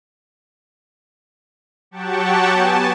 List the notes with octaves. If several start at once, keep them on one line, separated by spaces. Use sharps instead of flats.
F#3 G4 F#5 G5 A5 C#6
B3 G#5 A5